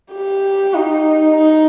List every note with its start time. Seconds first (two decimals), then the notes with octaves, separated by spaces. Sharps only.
0.13 G4
0.74 D#4
1.36 D#4